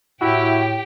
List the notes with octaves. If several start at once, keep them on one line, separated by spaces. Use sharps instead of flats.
A2 E4 F#4 G4 G5